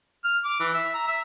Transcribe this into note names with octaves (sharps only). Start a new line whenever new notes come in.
F6
D6
E3
E5
A#5
E5